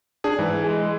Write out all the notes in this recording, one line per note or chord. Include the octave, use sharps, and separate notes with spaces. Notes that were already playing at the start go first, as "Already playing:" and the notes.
D4 G#4
G#2 E3
G#3